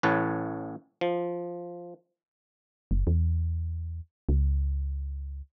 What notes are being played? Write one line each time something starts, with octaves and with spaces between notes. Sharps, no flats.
A1 A2 B4 C#5 A5
F3
F#1
E2
C#2